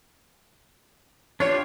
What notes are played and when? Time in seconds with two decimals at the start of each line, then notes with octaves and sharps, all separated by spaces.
1.40 D4 F4 G4 C#5